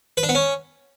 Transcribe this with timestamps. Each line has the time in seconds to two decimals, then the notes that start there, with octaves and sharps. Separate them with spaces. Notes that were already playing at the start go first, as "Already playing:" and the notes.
0.17 B4
0.23 D4
0.29 B3
0.35 C#4